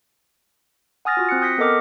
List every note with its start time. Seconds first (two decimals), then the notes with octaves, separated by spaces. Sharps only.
1.05 F#5 G#5 D#6 F6 A6 A#6
1.17 F4 F#4
1.29 C4 F#6 A#6 C#7
1.42 D#6 G6 A#6 B6 C#7
1.58 B3 A4 A#4 D#5 D6 F6